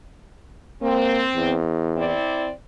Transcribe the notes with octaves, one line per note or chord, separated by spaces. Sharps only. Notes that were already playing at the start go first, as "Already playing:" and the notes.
A#3 C4
E2
C4 E4 D5